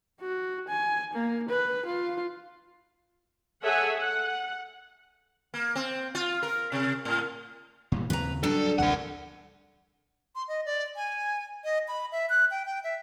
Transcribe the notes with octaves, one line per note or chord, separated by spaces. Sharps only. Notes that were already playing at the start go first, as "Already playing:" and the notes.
F#4
G#5
A#3
B4
F4
G#4 A4 C#5 E5 F#5 G#5
F#5
A#3
C4
F4
A#4
C3
A2
A#2 E3 G3
D#2 C#3 C4 B4 A#5
F#3 G3 D4 A4
A1 D2 C3 A#4 F#5
C6
D#5
D5
G#5
D#5
B5
E5
F#6
G5
G5
E5